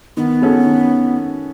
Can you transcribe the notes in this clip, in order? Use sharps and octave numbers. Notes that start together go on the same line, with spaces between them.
D#3 B3
G#3 C#4 F#4 A4
D#3